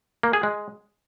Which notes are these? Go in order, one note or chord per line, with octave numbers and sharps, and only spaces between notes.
A#3
G#4
G#3